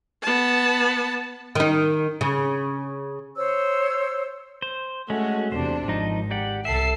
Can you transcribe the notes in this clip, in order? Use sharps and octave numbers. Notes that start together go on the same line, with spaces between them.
B3 A5
D#3 D#4
C#3
C5 C#5 E6
C5
G#3 A3 C#4 F#4
E2 C3 D4 C5
G#1 F3 D#4
G4 D5 F#5
C2 A4 E5 C7